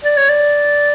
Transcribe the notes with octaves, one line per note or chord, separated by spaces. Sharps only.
D5
C#5
D5